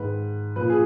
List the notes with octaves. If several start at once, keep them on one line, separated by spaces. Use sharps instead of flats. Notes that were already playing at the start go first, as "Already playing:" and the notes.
Already playing: G#2 D#3 B4
A#2 F3 B4
G#4